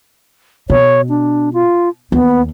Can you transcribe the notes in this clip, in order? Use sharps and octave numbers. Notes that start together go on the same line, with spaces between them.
B2 C#5
D4
F4
D#2 B3